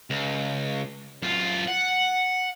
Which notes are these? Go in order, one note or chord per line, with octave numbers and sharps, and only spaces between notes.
C#2
F#2 F4
F#5